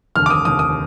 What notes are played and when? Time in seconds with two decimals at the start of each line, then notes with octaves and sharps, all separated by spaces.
0.16 F1 D#2 D3 F6
0.26 D6
0.30 D#6
0.44 F1 D#2 D3 D#6
0.59 D#6